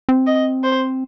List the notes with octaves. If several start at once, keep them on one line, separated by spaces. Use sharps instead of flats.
C4
D#5
C5